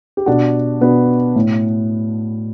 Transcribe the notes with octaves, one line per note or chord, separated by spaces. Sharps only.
G4
B2 D4 F#4
B2 B3 D4
A2